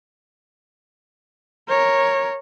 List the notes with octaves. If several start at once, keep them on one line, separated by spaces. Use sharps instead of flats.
A#4 C#5